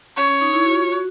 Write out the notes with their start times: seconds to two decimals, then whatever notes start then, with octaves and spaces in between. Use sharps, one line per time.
0.17 C#4 C#5
0.28 C#4
0.41 D#4
0.53 E4
0.65 F#4
0.72 F4
0.92 F#4